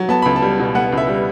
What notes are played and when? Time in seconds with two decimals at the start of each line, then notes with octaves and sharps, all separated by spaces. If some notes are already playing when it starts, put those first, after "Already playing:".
Already playing: F#3
0.09 B3 A5
0.22 C#2 B5
0.36 A5
0.42 G3
0.59 B2
0.75 B3 F#5
0.92 C#2
0.98 E5
1.08 G3